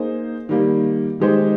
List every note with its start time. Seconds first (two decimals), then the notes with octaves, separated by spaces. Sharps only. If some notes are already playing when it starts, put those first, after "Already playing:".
Already playing: A#3 D#4 G#4 C5
0.49 D#3 G3 A#3
1.20 D#3 G#3 D#4 G4 C5